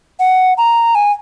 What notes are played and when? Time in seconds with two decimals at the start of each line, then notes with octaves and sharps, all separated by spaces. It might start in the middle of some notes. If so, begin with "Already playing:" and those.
0.20 F#5
0.58 A#5
0.95 G#5